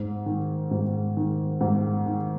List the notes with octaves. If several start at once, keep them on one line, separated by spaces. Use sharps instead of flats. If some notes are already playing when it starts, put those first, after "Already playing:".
Already playing: G#2
D#3
G#2
D#3
G#2
D#3